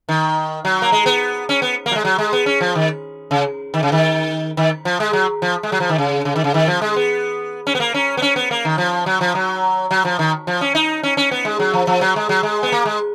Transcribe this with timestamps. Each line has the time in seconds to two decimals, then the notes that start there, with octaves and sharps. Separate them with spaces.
0.09 D#3
0.65 F#3
0.82 A#3
0.92 G#3
1.06 B3
1.49 C#4
1.62 B3
1.86 A#3
1.91 F#3
1.96 G#3
2.05 F#3
2.18 G#3
2.33 B3
2.46 C#4
2.61 F3
2.75 D#3
3.31 C#3
3.74 D#3
3.83 C#3
3.92 D#3
4.57 D#3
4.85 F3
5.00 G#3
5.13 F#3
5.42 F3
5.63 G#3
5.72 F#3
5.80 F3
5.89 D#3
5.98 C#3
6.25 C#3
6.36 D#3
6.44 C#3
6.54 D#3
6.67 F3
6.82 G#3
6.96 B3
7.67 C#4
7.75 B3
7.80 A#3
7.94 C#4
8.17 B3
8.22 C#4
8.36 B3
8.51 A#3
8.65 D#3
8.78 F3
9.06 F#3
9.21 F3
9.35 F#3
9.91 F#3
10.05 F3
10.19 D#3
10.47 F3
10.61 C#4
10.75 D#4
11.03 C#4
11.17 C#4
11.31 B3
11.45 G#3
11.59 F#3
11.73 F3
11.87 F3
12.01 F#3
12.16 G#3
12.29 F#3
12.43 G#3
12.63 B3
12.72 A#3
12.85 G#3